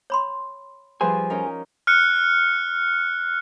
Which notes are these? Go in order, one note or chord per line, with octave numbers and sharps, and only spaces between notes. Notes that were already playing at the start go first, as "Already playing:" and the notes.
C#5 B5 C6
F3 G3 G#4 B4 C5 G#5
C#4 D#4 A#4
F6 F#6 C#7